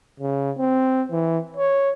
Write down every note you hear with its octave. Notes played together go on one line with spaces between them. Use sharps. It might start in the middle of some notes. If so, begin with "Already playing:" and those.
C#3
C4
E3
C#5